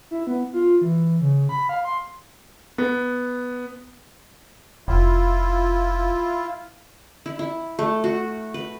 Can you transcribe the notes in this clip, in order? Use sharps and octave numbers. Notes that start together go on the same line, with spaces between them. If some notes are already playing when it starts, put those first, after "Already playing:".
E4
B3
F4
E3
C#3
B5
F5
C6
B3
F1 E4 F4
E4
E4
A3
F#4
B4